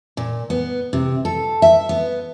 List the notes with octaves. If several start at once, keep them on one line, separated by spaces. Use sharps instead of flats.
A#2
B3
C3
A4
E5
B3